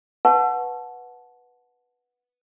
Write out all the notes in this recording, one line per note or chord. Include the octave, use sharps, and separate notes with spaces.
B4 F#5 A5 C#6